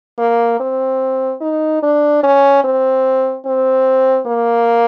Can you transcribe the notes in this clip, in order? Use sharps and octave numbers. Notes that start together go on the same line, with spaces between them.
A#3
C4
D#4
D4
C#4
C4
C4
A#3